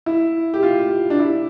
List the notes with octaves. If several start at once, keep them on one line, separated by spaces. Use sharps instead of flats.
E4
G4
F4
D4
E4